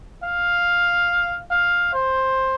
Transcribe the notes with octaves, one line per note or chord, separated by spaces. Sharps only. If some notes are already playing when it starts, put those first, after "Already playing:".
F5
F5
C5